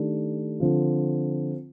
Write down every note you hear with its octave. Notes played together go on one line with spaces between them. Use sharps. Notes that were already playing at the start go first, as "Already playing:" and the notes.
Already playing: D#3 A3 D4 G4
D3 F3 C4 F4